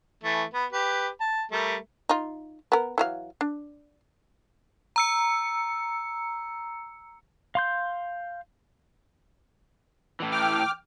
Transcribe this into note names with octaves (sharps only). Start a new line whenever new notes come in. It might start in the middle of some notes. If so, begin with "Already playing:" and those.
E3 A3
B3
G4 B4
A5
G3 A3 A#4
D#4 F4
B3 A#4
E3 F#3 F5
D4
A#5 E6 C#7
F5 C6 G6
A2 E3
G5 D6 F6